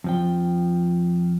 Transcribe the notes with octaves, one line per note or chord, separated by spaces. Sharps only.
F2 F3 G5